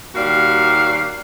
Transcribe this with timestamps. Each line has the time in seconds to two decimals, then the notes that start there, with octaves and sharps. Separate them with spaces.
0.15 D#2 G3 F#4 F5